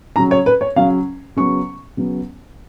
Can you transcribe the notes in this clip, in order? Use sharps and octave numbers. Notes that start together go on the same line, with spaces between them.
C#3 F#3 C#4 A#5
C#5
B4
C#5
C#3 F#3 C#4 F5
C#3 F#3 B3 C#6
C#3 F#3 B3